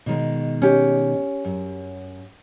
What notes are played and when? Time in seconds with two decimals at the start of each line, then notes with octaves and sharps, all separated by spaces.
0.06 B2 D#3 G#3
0.62 C#4 G4
1.45 F#2